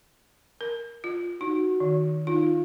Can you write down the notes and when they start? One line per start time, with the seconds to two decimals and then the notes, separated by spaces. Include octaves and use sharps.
0.61 A#4
1.04 F4
1.41 D#4 F#4
1.80 D#3
2.27 D#4 F4